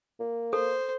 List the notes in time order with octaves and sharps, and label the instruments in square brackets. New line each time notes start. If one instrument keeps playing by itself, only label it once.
[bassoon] A#3
[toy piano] A4 [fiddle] C5